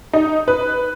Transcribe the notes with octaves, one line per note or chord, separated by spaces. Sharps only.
D#4
B4